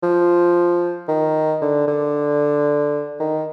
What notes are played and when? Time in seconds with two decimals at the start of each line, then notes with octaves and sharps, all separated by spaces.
0.03 F3
1.08 D#3
1.61 D3
1.87 D3
3.20 D#3